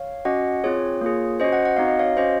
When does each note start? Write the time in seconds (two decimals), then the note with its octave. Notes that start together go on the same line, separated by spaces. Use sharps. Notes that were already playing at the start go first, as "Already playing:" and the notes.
Already playing: C#5 F5
0.25 C#4 F#4 D#5 F#5
0.64 C4 F4 G#4 C#5
1.01 A#3 F4 G#4
1.40 C#4 F#4 C5 D#5
1.53 D#5 F#5
1.65 F#5
1.77 C4 D#4 F#4 F5
1.88 D#5
1.99 C#5 F5
2.17 C#4 F#4 C5 D#5